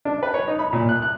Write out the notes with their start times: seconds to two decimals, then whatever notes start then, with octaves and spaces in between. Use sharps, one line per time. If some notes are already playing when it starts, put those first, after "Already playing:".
0.05 D4
0.23 B4
0.34 C#5
0.48 D#4
0.59 B5
0.73 A#2
0.89 F#6
1.02 F#6